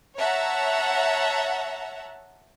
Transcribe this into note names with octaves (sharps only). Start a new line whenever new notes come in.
C#5 E5 F#5 A5 A#5